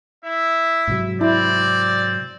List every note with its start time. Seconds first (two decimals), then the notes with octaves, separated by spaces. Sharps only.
0.24 E4 E5
0.87 G#2 C3 F#3
1.21 C4 E4 D5